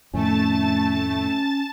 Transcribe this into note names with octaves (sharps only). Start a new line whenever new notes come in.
F2 A2 D#3 A3 C#4 A5 A6